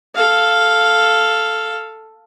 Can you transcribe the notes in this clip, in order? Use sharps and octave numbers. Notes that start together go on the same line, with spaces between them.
A4 F5